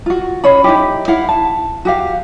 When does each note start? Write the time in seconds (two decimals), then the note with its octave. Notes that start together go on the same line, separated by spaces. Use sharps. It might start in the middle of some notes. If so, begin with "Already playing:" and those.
0.06 F4 F#4
0.44 C#4 C#5 D#5 B5
0.64 D#4 E4 G4
1.08 E4 F5 F#5
1.29 A5
1.85 F#4 G4 F5